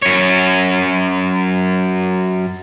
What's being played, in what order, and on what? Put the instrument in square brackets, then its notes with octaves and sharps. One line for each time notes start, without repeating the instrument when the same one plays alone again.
[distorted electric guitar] F#2 C#5